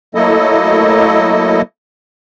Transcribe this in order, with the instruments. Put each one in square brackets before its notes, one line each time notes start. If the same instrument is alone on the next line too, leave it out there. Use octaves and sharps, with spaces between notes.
[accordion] F#3 A3 A#3 E4 A4 D#5